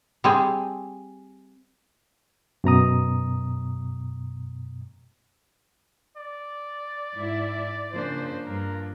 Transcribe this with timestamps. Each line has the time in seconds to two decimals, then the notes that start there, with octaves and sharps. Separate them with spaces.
0.24 G3 C4 G#4
2.64 F#2 B2 A#5 D#6
6.17 D5
7.15 G#2 E4
7.94 C#3 F3 A#3 D4 C5
8.45 G2 A#4